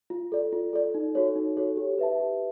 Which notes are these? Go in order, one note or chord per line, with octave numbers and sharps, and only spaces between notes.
F4
A4 D5
F4
A4 D5
D#4
F#4 A4 C#5
D#4
F#4 A4 C#5
G4
B4 E5 A5
G4